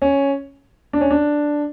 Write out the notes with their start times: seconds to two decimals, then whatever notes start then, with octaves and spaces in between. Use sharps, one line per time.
0.02 C#4
0.93 D4
1.01 C#4
1.11 D4